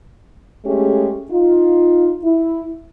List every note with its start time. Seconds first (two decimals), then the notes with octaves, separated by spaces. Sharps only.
0.65 G#3 A3 C#4 G4 G#4
1.30 D#4 F4
2.23 E4